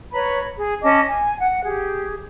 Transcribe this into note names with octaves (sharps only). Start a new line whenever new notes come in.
B4 C#5 A#5 B5
G#4
C#4 D#5 A5 D6
G#5
F#5
G4 G#4